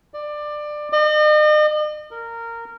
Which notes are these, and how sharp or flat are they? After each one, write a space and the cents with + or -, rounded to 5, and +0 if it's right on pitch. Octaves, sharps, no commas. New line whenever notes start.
D5 +20
D#5 -40
A#4 -15